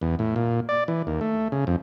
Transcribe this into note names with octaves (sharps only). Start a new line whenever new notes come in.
E2
A2
A#2
D5
E3
D#2
A3
C#3
F2